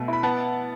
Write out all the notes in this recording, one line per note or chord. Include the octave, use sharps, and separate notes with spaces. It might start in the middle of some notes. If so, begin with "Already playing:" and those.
Already playing: B2 A3
E4 B5
B3 F#5 A5